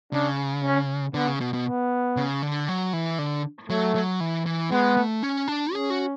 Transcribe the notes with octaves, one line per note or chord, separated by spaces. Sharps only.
C#3 D4
C#4
D3 B3
C#3
B2
B2
B3
C#3
D3
F#3
E3
D3
F#3 A3
F#3
E3
E3
G#3 B3
A3
C#4
D4
C#4 G#4
F#4